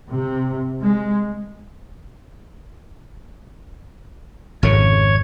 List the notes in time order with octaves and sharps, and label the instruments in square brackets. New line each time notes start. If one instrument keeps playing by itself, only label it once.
[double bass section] C3
G#3
[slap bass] G#1 F2 C#3 [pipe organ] C#5 G#6